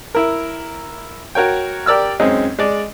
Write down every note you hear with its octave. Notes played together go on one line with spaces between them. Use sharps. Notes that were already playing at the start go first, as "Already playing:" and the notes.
E4 A#4
F#4 A#4 C#5 G5
G4 A#4 D5 E6 F6
F#2 G#3 C4 C#4 D#4
G#3 D5